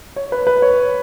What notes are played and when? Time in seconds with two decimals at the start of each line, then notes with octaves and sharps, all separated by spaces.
0.16 C#5
0.32 B4
0.47 B4
0.62 C#5